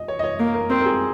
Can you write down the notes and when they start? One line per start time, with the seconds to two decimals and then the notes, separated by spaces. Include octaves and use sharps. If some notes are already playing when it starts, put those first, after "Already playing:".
Already playing: D#5
0.08 C#5
0.19 D#5
0.24 C#5
0.39 A#3 A#4
0.54 A#4
0.70 C4 A#4
0.81 A#4
0.86 G#4